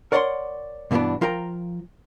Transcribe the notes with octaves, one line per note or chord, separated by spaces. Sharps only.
A#4 C#5 D5 F#5 A#5 C6
G2 B2 E3 A#3 B3 D4
F3 F4 A#4 G5 A#5